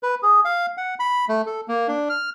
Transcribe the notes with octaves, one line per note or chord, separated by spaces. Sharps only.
B4
G#4
F5
F#5
B5
A3
A4
A#3
D4
F6